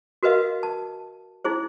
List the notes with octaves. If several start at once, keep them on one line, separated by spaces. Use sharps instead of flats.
F#4 A#4 B4 D#5 F5
A5
D#4 E4 G#4 C5